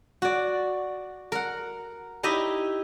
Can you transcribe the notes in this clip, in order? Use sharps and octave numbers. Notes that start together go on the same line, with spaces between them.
F#4 D5
A#4 F#5
D#4 E4 G4 D#5 E5